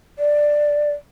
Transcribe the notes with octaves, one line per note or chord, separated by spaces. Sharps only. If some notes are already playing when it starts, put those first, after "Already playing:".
D5